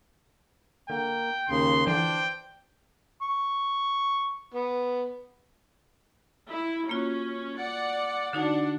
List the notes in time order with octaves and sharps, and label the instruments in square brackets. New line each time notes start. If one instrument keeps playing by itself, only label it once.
[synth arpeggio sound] D3 [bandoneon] A#3 [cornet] G5
[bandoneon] D#2 C#3 [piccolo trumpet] C6
[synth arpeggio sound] D3 E3 F3 [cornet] D4 [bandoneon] C5 [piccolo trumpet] G5
[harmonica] C#6
B3
[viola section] E4
[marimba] A#3 F4 F#4 [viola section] C#4
[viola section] D5 F#5
[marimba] D3 D#4 F#4 [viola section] D4 F#5